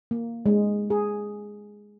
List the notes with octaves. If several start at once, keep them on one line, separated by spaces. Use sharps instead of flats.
A#3
G#3
G#4